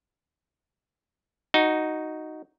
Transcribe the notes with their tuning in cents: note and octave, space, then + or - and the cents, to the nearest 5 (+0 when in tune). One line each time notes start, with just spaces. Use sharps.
D#4 +0 F#4 +0